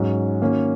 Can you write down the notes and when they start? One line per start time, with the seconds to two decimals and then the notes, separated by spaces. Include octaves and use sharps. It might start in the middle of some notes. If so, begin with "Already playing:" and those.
Already playing: G#2 F#3 C#4
0.41 D#3 A#3 C#4 F#4